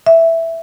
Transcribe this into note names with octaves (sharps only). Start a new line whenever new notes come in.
E5